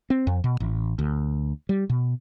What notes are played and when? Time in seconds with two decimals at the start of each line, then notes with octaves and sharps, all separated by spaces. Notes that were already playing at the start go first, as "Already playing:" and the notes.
0.10 C4
0.27 F2
0.44 B2
0.60 A1
0.99 D2
1.69 G3
1.90 B2